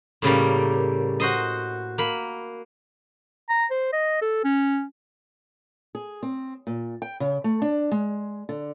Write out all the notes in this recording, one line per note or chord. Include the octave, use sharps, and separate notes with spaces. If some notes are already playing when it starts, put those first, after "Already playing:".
A2 C#3 G3 A#3
F#4 C5 D#5
A#3 B5
A#5
C5
D#5
A4
C#4
G#4
C4
A#2
G5
C#3
A3
D4
G#3
D3